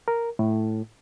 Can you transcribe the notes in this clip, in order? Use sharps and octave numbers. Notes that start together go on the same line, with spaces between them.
A#4
A2